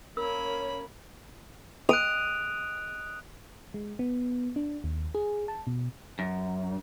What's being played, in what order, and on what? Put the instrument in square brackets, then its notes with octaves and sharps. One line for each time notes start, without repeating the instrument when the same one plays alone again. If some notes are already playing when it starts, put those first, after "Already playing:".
[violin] A#3 B5 [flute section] C#4 C#5 [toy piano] A#4 E6
[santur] D#6 [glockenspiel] F#6 D7 F7
[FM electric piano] G#3
B3
D4
D#2
G#4
A5
B2
[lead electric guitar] F#2